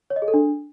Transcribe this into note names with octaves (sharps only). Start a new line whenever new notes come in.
C#5
D#5
G#4
A4
D4